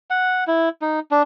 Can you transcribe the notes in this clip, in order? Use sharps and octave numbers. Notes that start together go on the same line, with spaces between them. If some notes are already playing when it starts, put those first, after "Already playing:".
F#5
E4
D#4
D4